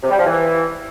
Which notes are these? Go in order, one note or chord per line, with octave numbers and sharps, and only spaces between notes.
C3
G3
F3
E3